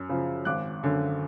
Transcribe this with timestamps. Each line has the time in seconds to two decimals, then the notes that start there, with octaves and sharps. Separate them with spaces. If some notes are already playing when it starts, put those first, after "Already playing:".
Already playing: F#2
0.09 C#3 F3
0.45 G#1 D6 F#6
0.83 F#2 D3